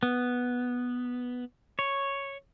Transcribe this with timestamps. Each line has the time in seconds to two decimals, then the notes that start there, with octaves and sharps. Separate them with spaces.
0.03 B3
1.79 C#5